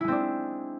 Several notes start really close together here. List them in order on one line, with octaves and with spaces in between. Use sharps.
E4 G#3 C4 D4